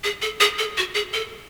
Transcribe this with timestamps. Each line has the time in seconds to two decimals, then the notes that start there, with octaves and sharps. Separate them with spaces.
0.04 G#4
0.22 A4
0.40 G#4
0.59 A4
0.77 F#4
0.95 G#4
1.13 A4